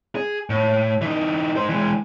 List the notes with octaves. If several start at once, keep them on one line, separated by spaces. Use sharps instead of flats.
G#4
A2
E3 D#4
D#4 C5
E3 G#3